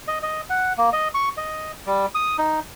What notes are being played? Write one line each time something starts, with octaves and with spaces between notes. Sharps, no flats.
D#5
D#5
F#5
A#3
D#5
C#6
D#5
G3
D#6
D#4